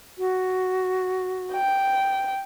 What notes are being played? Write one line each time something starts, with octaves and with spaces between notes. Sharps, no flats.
F#4
G5